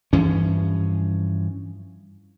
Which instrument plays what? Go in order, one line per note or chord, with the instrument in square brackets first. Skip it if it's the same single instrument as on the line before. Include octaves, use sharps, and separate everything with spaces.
[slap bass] G2 E3 F3 C#4